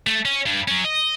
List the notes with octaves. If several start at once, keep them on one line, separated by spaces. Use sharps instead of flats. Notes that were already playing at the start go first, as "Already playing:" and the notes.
A3
C#4
G2
F#3 C#4
D#5